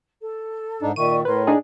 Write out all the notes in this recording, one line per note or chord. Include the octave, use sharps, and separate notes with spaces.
A4
G#2 D4 D#4
A#2 D#3 D5 E5 C#6 D#7
A2 A#4 B4 C#5 C6
D4 D#4 G#4